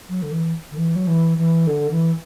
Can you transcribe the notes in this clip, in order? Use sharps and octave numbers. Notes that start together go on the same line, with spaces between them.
F#3
D3
E3
D3
E3
F#3
E3
E3
D3
E3